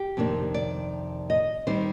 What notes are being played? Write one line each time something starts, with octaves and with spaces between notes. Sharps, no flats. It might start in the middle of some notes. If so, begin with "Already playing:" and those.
Already playing: G4
F2 C3 D#3 A#3 D4
D5
D#5
D#3 G3 C4 D#4 C5